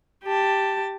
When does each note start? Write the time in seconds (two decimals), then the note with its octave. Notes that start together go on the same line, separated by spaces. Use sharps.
0.24 G4 A5